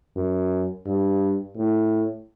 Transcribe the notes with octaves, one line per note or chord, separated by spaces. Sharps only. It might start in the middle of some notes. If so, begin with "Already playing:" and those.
F#2
G2
A2